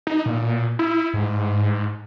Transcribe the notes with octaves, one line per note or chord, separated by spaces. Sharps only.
D#4
A#2
E4
G#2